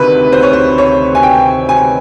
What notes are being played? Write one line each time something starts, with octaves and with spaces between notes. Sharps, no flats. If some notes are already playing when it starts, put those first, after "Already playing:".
Already playing: D2 C3 D#3 B4
C5
C#5
C5
C#5
G#5
G5
G#5